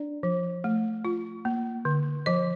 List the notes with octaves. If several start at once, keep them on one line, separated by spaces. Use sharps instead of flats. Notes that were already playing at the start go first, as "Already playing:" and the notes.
Already playing: D4 D5
F3
A3
F4
A#3
D3
F3 D#5